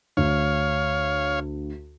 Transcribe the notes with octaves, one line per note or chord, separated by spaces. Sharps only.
D2 C#5 F5